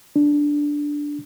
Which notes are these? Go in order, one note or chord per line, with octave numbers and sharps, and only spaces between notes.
D4